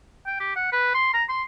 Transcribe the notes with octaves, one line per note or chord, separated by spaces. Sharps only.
G5
G4
F#5
B4
C6
A#5
C6